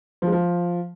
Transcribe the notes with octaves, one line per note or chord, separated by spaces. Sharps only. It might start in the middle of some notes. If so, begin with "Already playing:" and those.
F3
G#3
F3